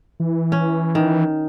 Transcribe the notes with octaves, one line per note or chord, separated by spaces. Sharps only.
E3
C#4
D#3